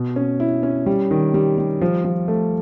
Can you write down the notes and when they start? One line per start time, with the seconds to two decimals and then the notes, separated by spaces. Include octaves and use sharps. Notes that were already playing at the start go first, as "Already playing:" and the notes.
Already playing: B2
0.16 C#4
0.40 E4
0.63 C#4
0.86 G3
1.11 D#3
1.34 G3
1.58 G3
1.81 F3
2.04 F3
2.28 A3